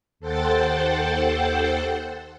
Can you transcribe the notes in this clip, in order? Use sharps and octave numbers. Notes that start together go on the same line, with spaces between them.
D#2 A4 C5 F#5 G5 A6